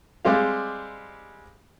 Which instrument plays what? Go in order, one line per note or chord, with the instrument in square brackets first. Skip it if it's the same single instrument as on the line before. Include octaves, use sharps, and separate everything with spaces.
[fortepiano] G3 G#3 C4 G4 F5